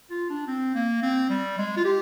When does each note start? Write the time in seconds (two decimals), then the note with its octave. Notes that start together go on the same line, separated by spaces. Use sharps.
0.11 F4
0.30 D4
0.47 C4
0.75 A#3
1.03 C4
1.30 G3
1.58 G#3
1.77 F4
1.85 G4